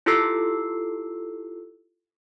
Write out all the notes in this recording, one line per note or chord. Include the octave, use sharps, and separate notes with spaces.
E4 F4 G4 A4 E6 C7